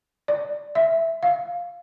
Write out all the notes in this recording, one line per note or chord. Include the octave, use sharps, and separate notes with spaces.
D5
E5
F5